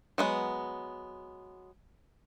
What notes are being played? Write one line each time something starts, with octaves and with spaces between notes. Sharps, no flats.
F#3 G#3 B3